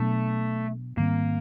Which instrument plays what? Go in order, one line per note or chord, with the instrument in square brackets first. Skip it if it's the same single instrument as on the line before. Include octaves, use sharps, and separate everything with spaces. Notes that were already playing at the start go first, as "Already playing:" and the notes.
Already playing: [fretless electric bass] B2 F#3 B3 D4 [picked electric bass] A3
[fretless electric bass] G#2 D#3 G3 C4 [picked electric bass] A#3